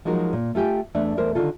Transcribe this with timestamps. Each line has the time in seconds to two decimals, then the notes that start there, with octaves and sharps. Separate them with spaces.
0.05 F3 F#3 G#3 D#4 F#4 A#4
0.33 A#2
0.55 A3 F4 G4 G5 G#5
0.95 E2 A3 D4 D5
1.17 E2 A3 A#4 C5
1.35 D3 D#3 F4 A4